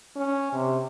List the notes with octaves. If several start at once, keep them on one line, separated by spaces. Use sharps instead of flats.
C#4
C3